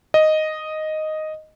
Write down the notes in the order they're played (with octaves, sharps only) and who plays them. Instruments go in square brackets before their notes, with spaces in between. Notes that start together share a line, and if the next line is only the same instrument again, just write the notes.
[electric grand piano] D#5